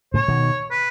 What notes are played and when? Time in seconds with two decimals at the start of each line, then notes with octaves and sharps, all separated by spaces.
0.14 A2 C#3 C#5
0.28 B2 D#3
0.71 B4